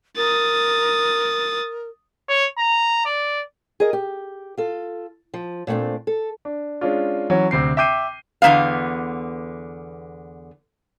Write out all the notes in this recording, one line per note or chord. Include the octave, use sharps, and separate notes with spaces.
A#4 D#6 A6
C#5
A#5
D5
G#4 A#4 D#5
G4
F4 A4
F3
A#2 A3 B3 C4 D4
A4
D4
G#3 C#4 D4 F4
E3 F#3 C#4
D2 C3 C4 C7
E5 G5 D6 G6 C7 D#7
E2 D3 G3 B3 F5